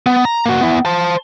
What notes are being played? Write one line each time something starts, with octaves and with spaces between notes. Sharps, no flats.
B3
A#5
A#3 F#4
B3 E4
C5 A5